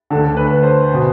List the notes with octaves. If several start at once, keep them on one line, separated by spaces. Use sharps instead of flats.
D2 D3 A4
B4
C5
B2